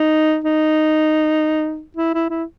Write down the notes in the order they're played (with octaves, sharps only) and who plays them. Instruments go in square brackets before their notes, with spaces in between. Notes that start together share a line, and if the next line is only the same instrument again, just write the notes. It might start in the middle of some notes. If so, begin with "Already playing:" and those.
Already playing: [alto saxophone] D#4
D#4
E4
E4
E4